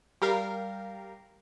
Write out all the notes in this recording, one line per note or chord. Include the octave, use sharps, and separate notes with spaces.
G3 G4 A#4 F5